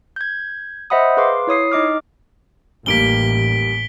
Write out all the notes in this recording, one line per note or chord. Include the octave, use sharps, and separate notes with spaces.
G6 G#6
C5 D#5 E5 F#5 B5 D#6
G#4 B4 F5 C6 D6
E4 C#5 D#6 C7
D#4 D#5 D6 F6
A1 D#2 G3 A#3 B6 D7 G7